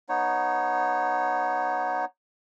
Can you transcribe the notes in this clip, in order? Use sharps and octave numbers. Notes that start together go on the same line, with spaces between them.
B3 D#4 C#5